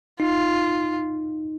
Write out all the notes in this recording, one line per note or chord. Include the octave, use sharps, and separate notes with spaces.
D#4 F4